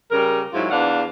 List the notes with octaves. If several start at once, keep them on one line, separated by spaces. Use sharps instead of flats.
C#3 G3 A#4
G#2 F#3 E4 F4
E2 D4 F5 F#5